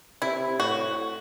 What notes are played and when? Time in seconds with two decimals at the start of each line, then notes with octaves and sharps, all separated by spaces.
0.22 C3 E4
0.59 A2 F#4